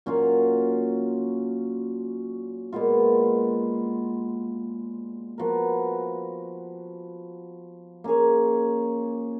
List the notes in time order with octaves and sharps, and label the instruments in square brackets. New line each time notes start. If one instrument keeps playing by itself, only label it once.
[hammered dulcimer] A#2 F#3 C#4 F4
A#2 G#3 B3 F4
F3 B3 F#4 A#4
A#3 C#4 G#4 C#5